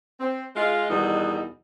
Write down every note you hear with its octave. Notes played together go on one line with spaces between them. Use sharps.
C4
G#3 F4
E2 B2 D#3 G3 D#4